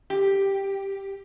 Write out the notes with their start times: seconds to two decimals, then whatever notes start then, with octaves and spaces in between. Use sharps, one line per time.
0.10 G4